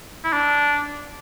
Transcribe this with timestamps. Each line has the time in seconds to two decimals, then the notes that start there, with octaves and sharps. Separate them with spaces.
0.24 E4
0.33 D4